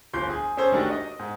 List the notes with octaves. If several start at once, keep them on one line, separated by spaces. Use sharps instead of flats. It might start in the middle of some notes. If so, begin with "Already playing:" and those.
D1 G1 F3 C6 G6
G#4
C#4 G#4 A4 C5
D#3 A3 D4 F#4 G4
D#5
G#2